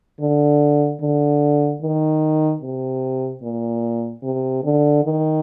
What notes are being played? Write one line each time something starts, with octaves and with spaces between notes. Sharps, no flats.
D3
D3
D#3
C3
A#2
C3
D3
D#3